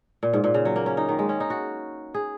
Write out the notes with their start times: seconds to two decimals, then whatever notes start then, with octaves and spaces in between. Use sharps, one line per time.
0.23 A#2
0.33 G#2
0.44 A#2
0.54 C#3
0.65 F#3
0.76 A#3
0.86 C#4
0.97 D#4
1.09 D#3
1.19 G#3
1.29 C#4
1.40 D#4
1.50 F#4
2.14 G#4